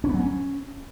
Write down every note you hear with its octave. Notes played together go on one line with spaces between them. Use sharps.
C#4
B3
F#3
C#4